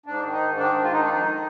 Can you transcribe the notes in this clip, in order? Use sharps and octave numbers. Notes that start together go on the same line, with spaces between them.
G#2 D4
D#3
D#4
G#2
D#3 D4
G#2
F4
D#3 D#4
D4
F2 D#4
D#3